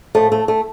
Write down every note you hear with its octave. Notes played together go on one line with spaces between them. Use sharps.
A2 F3 A3
A3
A3